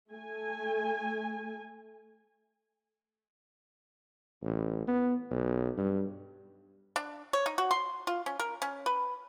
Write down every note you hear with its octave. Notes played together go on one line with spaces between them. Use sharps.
A3 G#5
A1
B3
B1
G2
D4
C#5
D#4
F#4
C6
F4
C#4
A#4
C#4
B4